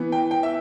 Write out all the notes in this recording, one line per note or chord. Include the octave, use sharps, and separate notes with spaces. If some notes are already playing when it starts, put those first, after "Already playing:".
Already playing: E3 B3
G5
G5
E5